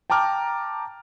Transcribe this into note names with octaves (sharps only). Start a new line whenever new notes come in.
G5 A5 A#5 D6 F6